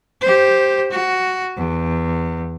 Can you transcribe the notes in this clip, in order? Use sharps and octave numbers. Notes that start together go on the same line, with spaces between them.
G4 C5
F#4
E2